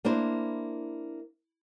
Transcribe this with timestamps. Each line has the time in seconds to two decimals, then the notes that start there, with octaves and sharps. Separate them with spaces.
0.05 A#3 D4 E4 C5